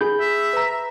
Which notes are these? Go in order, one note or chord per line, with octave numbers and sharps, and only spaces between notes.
G#4 B5 G6
E5
B4 A#5